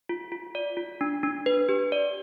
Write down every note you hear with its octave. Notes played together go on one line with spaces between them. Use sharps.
F4
F4
D5
F4
D4
D4
B4
G4
D5